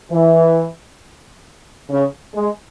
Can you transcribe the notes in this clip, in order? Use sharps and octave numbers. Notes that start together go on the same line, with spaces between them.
E3
C#3
G#3